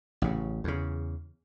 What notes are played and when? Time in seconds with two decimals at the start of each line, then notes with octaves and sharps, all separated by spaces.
0.22 A1 C#3
0.64 E2 C#3